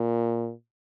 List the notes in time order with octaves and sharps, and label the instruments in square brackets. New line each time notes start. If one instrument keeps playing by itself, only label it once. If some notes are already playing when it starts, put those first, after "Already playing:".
Already playing: [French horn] A#2